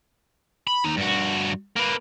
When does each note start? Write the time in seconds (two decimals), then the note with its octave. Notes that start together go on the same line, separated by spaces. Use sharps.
0.67 B5
0.84 D#2 D#4
0.97 G2 F#4
1.76 A#3 B4